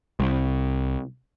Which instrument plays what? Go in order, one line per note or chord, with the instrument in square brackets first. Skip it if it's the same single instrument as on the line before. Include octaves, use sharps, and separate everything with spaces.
[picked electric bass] C2